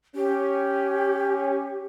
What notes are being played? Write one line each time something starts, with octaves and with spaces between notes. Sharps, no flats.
C#4 G4